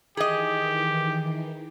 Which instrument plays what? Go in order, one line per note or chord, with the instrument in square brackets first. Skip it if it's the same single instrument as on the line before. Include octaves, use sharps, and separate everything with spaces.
[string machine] D#3 E3 [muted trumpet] G4 [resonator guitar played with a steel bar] G#4 D#5